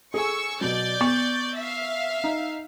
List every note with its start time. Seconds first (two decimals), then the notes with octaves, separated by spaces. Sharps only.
0.14 G#4 A4 G#5 C#6 E6
0.61 B2 F#3 D5 G6 A6
1.01 B3 C#6
1.56 E5 F5
2.24 D#4